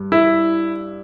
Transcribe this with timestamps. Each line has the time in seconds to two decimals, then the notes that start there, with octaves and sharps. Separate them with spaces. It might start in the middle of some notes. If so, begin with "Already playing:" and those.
Already playing: G2
0.12 E4